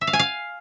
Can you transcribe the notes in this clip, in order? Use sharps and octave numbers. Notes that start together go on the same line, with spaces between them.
E5
F5
G#5
F5